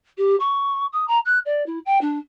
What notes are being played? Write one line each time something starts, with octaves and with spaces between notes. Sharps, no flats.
G4
C#6
D#6
A#5
F#6
D5
E4
G5
D4